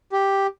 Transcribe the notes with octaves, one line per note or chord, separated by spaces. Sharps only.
G4